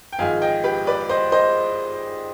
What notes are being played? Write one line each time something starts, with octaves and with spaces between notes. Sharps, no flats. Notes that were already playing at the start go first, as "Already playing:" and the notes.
G5
G#1 G#2 F3 G#3 F5 G#5
D#5 G5
G4 B4
B4 D5
C5 D#5
C5 D#5